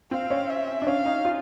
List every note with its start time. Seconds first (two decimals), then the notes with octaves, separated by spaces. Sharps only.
0.11 C4 F5
0.30 C#4
0.49 E5
0.82 D4
0.87 C#4 F5
1.05 D#4
1.25 F4